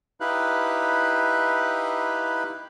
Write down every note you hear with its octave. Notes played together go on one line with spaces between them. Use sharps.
D#4 E4 G4 B4 F5 F#6